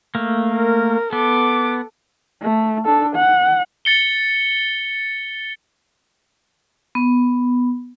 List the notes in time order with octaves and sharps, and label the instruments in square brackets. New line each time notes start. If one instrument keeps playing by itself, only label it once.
[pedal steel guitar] A3 A#3
[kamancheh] A#4
[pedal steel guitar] B3 [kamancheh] A4 D6
[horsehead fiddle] A3
D4 A4
F#5
[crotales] A6 C#7 G7
[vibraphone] B3